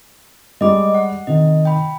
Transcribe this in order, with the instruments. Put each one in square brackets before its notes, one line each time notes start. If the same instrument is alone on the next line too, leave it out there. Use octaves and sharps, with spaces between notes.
[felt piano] G3 G#3 G4 [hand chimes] D#5 D6
[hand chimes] F#5
[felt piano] C3 D#3 [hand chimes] D#5
[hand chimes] G5 B5